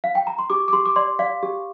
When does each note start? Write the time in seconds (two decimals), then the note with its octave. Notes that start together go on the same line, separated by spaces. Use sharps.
0.04 F5
0.15 G5
0.27 A#5
0.39 C6
0.50 G4 D6
0.68 D6
0.73 G4 C6
0.85 D6
0.96 D5 C6
1.19 D5 F5
1.43 G4